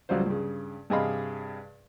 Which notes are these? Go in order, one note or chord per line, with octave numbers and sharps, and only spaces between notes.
C#2 F#3 G3 F4 C5
G2 C#3
G2 C3 G#4 D#5 F5 B5